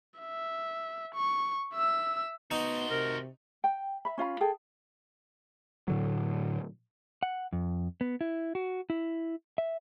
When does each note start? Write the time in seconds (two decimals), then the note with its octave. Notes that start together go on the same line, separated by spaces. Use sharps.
0.20 E5
1.15 C#6
1.74 E5 E6
2.51 B3 D#4 F#4 C5
2.90 C3 A#4
3.64 G5
4.05 E5 B5
4.18 C#4 F4 F5 B5
4.41 G#4 A4 G5
5.88 A2 D3 F#3
7.23 F#5
7.53 F2
8.01 B3
8.21 E4
8.55 F#4
8.90 E4
9.58 E5